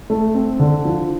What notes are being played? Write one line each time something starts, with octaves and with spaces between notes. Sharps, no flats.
A3
C4
D3
F3